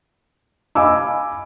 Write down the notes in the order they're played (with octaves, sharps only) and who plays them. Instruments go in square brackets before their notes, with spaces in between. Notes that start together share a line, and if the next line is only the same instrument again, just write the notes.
[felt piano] D#5 F5 G#5 B5 D6 E6